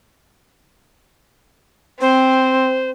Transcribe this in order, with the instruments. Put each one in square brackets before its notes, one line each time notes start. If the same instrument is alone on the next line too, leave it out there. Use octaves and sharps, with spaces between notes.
[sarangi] C4 [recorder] C5